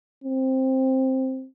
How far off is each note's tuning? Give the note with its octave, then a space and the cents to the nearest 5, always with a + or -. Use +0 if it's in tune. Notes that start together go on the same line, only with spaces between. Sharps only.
C4 +5